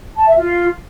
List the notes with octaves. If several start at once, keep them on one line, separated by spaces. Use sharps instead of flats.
A5
E5
F4